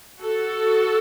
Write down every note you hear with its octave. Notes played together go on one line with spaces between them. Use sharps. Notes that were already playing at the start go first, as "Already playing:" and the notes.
F#4 A4